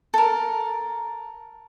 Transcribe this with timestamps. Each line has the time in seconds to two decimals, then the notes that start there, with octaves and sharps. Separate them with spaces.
0.14 A4 A#4